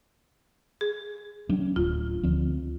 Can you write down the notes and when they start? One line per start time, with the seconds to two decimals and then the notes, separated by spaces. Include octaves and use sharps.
0.81 G#4
1.49 F#3 C#4 D4
1.76 D1 F4
2.23 D2 F3 C4